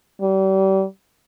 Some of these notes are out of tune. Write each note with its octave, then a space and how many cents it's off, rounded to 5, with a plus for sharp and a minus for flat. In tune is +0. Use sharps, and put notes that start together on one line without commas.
G3 -35